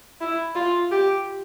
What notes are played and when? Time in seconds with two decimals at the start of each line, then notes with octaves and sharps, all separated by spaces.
0.21 E4
0.56 F4
0.91 G4